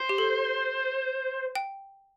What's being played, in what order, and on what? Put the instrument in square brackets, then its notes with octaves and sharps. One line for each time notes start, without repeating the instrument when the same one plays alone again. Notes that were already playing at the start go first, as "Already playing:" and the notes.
Already playing: [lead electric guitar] C5
[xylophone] G4
A4
G5